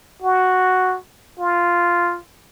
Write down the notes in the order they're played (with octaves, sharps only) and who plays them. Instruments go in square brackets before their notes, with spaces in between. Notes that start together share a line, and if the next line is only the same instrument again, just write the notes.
[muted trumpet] F#4
F4